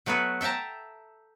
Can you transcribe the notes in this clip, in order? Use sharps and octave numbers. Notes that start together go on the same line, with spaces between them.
F#3 A3 B3 F#4 B4
A4 E5 G5 A5 A#5